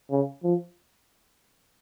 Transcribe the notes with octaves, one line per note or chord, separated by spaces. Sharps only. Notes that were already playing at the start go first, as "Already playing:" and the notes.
C#3
F3